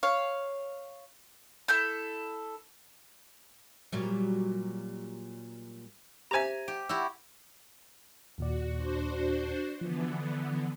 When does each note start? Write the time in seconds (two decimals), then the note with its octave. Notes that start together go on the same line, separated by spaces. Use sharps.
0.03 C#5 F5
1.68 E4 A4 G6
3.92 A#2 F#3 G3
6.31 G4 C5 E5 G#5 A#5
6.68 G4 D7
6.89 E4 F#4 G4 E6
8.38 D#2 A#2 F#4 D5
8.75 D4 F#4 C5
9.81 D3 E3 F3 B3